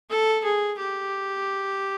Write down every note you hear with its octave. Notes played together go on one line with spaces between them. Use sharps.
A4
G#4
G4